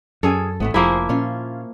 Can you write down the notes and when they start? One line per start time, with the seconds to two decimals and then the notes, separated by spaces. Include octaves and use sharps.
0.23 F#2 C#4 G#4 A4 G#5
0.60 G#1 A2 E3 A3 B3
0.74 F1 F3 A#3 E4 G#4 C5
1.09 A#2 C#4 F4